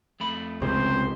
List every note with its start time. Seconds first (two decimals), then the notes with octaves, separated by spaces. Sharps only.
0.20 F2 A3 B5
0.62 C#2 C3 C5